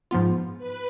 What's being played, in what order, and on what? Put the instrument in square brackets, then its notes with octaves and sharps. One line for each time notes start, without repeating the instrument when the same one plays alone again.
[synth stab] G#2 F3 B3 F4
[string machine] B4